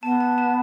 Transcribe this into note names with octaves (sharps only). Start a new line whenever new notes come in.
B3 A5
A5
A5